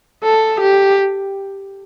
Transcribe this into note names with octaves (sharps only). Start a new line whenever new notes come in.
A4
G4